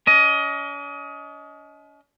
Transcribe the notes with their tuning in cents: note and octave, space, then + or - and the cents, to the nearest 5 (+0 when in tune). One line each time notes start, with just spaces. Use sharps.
C#4 +45 D#5 +20